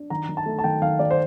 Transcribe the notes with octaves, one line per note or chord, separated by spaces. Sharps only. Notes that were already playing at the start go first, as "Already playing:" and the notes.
Already playing: D4
D#3 A#5
D#3
A5
A3
A5
D#3 G5
D#3 F5
D#3 D5
C5